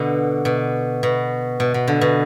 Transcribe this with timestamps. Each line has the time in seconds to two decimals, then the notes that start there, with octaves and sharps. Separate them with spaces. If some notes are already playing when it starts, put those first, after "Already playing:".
Already playing: B2 D3
0.45 B2
1.03 B2
1.60 B2
1.74 B2
1.87 D3
2.01 B2